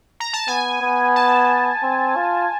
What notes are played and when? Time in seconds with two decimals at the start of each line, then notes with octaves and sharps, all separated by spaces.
0.20 A#5
0.33 A5
0.48 B3 G#5
0.81 B3
1.16 A5
1.83 C4
2.16 F4